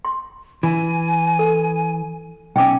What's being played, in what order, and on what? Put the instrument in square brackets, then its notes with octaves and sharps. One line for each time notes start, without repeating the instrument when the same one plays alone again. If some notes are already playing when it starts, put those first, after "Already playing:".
[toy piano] C6
[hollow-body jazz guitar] E3 [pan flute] G#5
[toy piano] A4
[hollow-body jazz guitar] B1 C#4 [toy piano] G5 D6